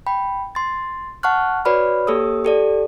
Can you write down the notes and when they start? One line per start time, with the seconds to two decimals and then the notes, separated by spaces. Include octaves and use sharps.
0.07 G5 B5
0.55 C6 A6
1.23 F#5 A5 C#6 F6 F#6
1.65 F#4 B4 C#5 D5 B5 F6
2.07 A#3 G4 A4 C#5 D#6 E6
2.45 G4 A4 D5